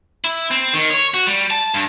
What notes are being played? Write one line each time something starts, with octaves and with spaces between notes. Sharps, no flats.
E4
C4
D#3
C#5
F#4
G3
A5
G2